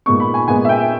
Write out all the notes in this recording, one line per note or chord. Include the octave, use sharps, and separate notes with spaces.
A#2 G#3 B3 C#6
B5
G#5
A#2 G#3 B3 G#5
E5
G5